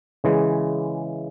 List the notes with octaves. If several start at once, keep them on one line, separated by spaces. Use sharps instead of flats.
C#3 E3 G#3